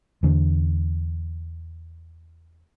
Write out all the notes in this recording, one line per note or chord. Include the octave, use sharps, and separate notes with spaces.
E2 D3